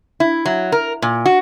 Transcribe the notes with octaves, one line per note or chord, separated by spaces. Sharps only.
E4
F#3
A#4
A#2
F#4